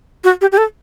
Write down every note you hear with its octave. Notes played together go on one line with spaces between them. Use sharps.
F#4
G4
G4
A4